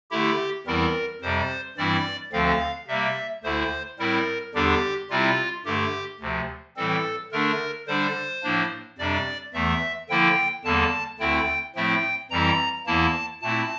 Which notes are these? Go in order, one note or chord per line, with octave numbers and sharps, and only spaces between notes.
D3 A3 E4 G4
E2 E3 G3 C4 E4 A#4
F2 C3 G3 C5
G2 E3 G3 C4 E4 D5
D2 D3 F3 C4 F5
C3 G3 A#3 E5
D2 D3 A3 E4 C5
A2 G3 C4 E4 A#4
E2 D3 G3 D4 G4
C3 G3 C4 E4 F4
G2 D3 A3 G4
D2 C3 F3
A2 E3 G3 C4 A4
D3 A3 D4 A#4
D3 G3 D4 C5
A2 F3 A#3 D4
F2 C3 G3 D4 D5
E2 E3 A3 E5
D3 F3 A#3 E4 G5
E2 D3 G3 A#3 A5
D2 D3 A3 C4 E4 G5
A2 F3 A3 C4 E4 G5
F2 E3 G3 C4 E4 A#5
E2 E3 A#3 E4 A5
A#2 A3 C4 E4 A5